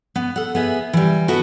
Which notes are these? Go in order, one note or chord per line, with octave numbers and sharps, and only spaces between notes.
B3
A4 F#5
B3 G#4 E5
E3 G3
B3 E4 F#4 A4